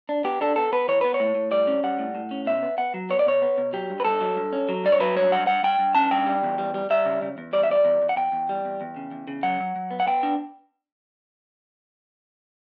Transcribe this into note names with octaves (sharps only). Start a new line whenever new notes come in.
D4
B3 G4
D4 A4
B3 A4
B3 B4
E3 C#5
B3 B4
C#5
A2
A2
G3 D5
C#4
G3 F#5
A2
A2
C#4
B2 E5
B3
B3 F#5
F#3
B3 C#5
D5
B2 C#5
B3
B2
F#3 G4
G2
B4
G2 A4
F#3
G2
C#4
F#3
G2 D5
C#5
F#3 B4
G2 C#5
G2 F#5
G2 F#5
G2 G5
G2
C#4 A5
G2 G5
G3
E2
G3
G3
G3 E5
C#3
C#3
E2
G3 D5
E5
G3 D5
E2
E2
F#5
E2 G5
E2
G3
E2
E2
C#3
E2
C#3
F#3 F#5
F#3
F#3
B3
F#5
B3 G5
D4